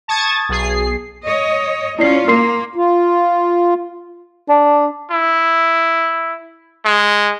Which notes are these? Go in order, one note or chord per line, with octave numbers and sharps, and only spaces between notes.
A5 C#6 D#6 G#6 A6
B1 G#4 C7
C#5 D#5
C#4 E4 F4 D5 C7
A#3 A#4 C6 C7
F4
D4
E4
G#3